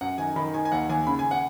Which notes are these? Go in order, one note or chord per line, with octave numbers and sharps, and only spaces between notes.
F#2 F#5
D#3 G#5
D#3 B5
D#3 G#5
G#5
D#2 F#5
D#2 G#5
C#3 B5
G#5
F#5